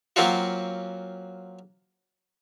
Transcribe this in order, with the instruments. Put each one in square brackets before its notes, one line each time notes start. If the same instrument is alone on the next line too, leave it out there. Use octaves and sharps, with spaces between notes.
[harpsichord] F#3 A#3 C4 C#4 F4 F#4